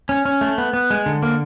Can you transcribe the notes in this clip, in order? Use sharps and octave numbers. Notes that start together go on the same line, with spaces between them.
C#4
C#4
A3
B3
B3
G#3
D3
A#3